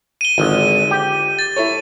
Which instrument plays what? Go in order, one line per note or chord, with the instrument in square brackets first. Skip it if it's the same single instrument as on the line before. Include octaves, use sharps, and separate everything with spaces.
[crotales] D#7 G7
[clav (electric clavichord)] G#1 [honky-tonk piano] D3 F3
[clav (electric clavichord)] G4
[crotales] A6
[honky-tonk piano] E4 A4 C#5